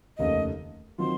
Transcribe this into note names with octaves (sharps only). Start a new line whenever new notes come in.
F1 D#2 C#3 A3 D#5
D#3 F#3 C4 F4 C6